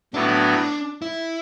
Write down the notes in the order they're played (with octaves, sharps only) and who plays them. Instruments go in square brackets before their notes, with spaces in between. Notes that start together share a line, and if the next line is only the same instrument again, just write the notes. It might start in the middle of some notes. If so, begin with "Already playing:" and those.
[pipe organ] A2 F#3 B3 E4 [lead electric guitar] D4
[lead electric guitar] D4
E4